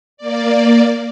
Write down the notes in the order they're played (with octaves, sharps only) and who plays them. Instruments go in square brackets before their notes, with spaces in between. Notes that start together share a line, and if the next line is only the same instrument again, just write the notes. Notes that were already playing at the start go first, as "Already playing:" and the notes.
[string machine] A#3 D5